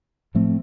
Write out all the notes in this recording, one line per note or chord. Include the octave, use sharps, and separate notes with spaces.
A2 F3 A3 C4